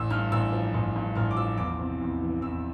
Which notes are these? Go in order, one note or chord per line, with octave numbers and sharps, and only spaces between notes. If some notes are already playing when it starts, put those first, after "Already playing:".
Already playing: A1 E6
G2 F6
A1 E6
F3
A1
G2
A1 F6
D6
F3 E6
E2 D6
C3
E2
E3
E2 E6